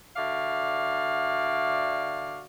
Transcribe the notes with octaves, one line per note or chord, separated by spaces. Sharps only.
D3 F#4 D5 E5 F5